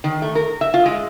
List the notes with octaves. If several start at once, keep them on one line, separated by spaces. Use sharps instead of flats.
D#3
A3
A#4
E5
F4
G#3